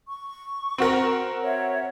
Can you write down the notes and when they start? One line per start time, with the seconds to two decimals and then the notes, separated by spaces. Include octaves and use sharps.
0.08 C#6
0.78 C4 F#4 A#4
1.44 C#5 E5 F#5